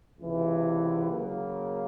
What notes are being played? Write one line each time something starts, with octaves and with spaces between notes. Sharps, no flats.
C#2 C3 E3
C#3 F#3 A#3